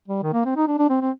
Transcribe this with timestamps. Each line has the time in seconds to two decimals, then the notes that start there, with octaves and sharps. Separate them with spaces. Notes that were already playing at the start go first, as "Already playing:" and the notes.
0.08 G3
0.23 D#3
0.33 A#3
0.45 C4
0.57 D#4
0.68 D4
0.79 D4
0.90 C4
1.01 C4